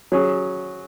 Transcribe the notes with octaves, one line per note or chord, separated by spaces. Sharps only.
F#3 C#4 G#4